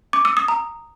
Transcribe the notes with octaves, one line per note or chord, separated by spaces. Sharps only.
D6
E6
D#6
A#5